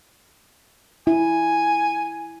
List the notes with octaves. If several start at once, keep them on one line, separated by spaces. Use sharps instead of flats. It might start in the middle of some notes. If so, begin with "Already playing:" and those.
E4 G#5